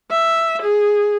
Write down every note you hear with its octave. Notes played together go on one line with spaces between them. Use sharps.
E5
G#4